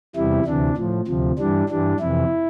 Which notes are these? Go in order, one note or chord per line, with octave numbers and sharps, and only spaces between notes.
E2 C3 E3 G3 E4
D2 C3 E3 D4
A2 F3
D2 C3 F3
G2 E3 G3 D4
G2 E3 G3 D4
F2 C3 E3 E4